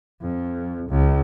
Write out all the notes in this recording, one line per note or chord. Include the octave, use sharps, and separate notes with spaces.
F2
C#2